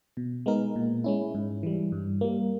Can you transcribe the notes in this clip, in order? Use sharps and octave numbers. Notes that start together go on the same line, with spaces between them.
B2
G#3 B3 D#4 A#4
A#2
G#3 C#4 E4
G#2
E3 G3
G2
G3 A#3